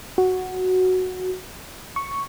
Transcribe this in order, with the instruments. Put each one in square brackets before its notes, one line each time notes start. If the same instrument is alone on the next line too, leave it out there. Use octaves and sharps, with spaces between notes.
[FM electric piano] F#4
C#6